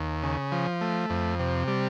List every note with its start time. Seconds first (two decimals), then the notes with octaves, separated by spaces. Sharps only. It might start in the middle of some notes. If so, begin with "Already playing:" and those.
Already playing: D#2
0.23 C#3
0.52 F3
0.81 A3
1.10 F2
1.39 C3
1.68 G3